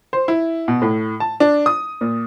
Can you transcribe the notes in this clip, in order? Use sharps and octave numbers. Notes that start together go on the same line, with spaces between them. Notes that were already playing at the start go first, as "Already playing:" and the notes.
C5
E4
B2
A2
A5
D4
D#6
A#2